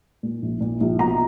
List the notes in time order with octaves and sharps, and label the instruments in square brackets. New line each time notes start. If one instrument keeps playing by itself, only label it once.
[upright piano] A#2
A#1
A#2
A#1
B2 A#5